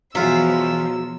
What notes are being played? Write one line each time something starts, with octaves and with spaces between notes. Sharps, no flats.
E2 B2 F3 F#3 F4 E5 E6